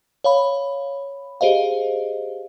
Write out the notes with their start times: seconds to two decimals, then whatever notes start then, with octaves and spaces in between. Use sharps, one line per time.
0.24 C#5 F5 B5
1.41 G4 G#4 C5 D#5 F5